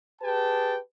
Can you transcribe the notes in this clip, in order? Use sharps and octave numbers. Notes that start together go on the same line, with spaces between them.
G4 G#4 B4 G5 A5